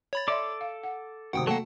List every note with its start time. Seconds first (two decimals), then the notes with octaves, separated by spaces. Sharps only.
0.13 C#5 B5 A6
0.28 A4 D5 E5 C6 D6
0.61 F5
0.83 F#5
1.33 G#1 C3 F#4 F#5 G5 D#6
1.47 F#3 A3 A#3 F#5 G5 A5